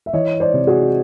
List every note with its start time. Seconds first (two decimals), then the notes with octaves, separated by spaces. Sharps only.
0.06 E5
0.13 E3 C#5 D#5
0.40 C5 D5
0.54 C3
0.67 F#4 G#4